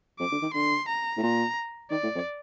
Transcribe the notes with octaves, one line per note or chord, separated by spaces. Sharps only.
F2 D6
D3
D#3
D3 C6
A#5
A2
A#2 A#5
D#3 D5
A2
F2